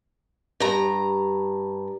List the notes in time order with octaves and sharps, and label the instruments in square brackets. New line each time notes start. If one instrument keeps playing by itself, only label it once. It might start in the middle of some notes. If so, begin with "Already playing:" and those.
[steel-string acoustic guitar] G2 A#5